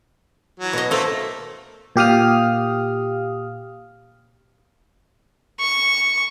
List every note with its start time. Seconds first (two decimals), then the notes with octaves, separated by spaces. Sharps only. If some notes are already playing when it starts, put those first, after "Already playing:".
0.60 E3 F#3
0.73 B2 D#5
0.91 A3 A#3 A4 C5
1.96 A#2 G4 F5 D#6 F6
5.60 C#6